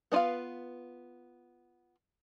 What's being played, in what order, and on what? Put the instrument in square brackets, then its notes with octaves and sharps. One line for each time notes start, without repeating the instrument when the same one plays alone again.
[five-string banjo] B3 D4 F4 B4 F5